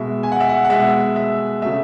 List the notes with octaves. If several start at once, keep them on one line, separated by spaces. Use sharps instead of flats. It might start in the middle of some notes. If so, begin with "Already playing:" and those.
Already playing: B2 G#3 E5
G#5
F#5
E5
F#5
F#5
B2 G#3 E5
E5
C#3 F#3 A3 E5